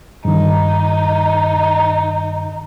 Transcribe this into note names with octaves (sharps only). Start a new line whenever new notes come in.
G2 D#3 D#4